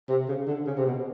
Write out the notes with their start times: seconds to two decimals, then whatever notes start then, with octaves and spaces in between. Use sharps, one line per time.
0.09 C3
0.28 C#3
0.48 D3
0.67 C#3
0.77 C3
0.86 B2